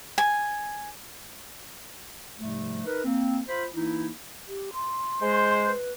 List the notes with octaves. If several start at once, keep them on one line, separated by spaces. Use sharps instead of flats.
G#5
G#2 C3 F3 G3 A3
D#4 A#4 B4
A#3 C4
F4 C5 B5
E3 A#3 D#4 E4
G4
C6
G#3 C5
B4